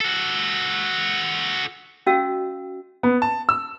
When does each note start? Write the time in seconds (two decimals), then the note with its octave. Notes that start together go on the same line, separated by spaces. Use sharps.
0.01 F#4 A4
2.06 C#4 F#4 D#5 F5 E6
3.03 B3
3.22 A5
3.49 E6